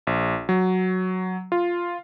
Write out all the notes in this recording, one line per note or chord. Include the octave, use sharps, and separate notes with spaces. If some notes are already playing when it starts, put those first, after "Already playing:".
A#1
F#3
F4